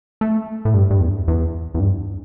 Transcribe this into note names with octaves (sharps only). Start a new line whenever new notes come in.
A3
A2
G2
G2
E2
E2
E2
G2